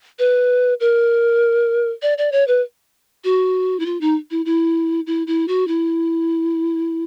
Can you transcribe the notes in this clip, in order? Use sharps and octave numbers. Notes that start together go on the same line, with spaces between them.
B4
A#4
D5
D5
C#5
B4
F#4
E4
F4
D#4
E4
E4
E4
E4
F#4
E4